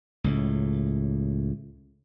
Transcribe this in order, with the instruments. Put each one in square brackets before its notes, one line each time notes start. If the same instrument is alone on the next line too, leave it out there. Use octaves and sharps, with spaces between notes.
[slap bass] C#2 A2